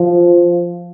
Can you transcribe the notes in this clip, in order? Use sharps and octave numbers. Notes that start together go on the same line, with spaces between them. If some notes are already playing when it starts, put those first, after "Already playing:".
Already playing: F3